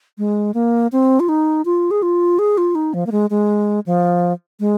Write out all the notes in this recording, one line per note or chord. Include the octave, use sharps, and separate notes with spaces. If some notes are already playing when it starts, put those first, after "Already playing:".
G#3
A#3
C4
F4
D#4
F4
G#4
F4
G#4
F4
D#4
F3
A#3
G#3
G#3
F3
G#3